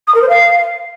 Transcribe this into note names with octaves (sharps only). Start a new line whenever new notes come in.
D#6
A#4
C5
F5